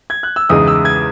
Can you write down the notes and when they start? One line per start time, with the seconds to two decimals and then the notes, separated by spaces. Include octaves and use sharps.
0.10 G#6
0.23 F#6
0.36 E6
0.49 E2 C#3 G#3 D#4 D#6
0.67 E6
0.85 G#6